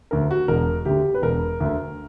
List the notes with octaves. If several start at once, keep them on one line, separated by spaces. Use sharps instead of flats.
D2 D3 A#4
F#4
E1 A#4
D2 D3 G4
B4
E1 A#4
D2 D3